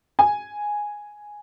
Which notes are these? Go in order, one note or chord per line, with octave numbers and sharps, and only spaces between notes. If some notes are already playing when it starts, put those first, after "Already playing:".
G#5